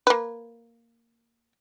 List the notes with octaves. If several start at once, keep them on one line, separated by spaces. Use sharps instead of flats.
A#3 B4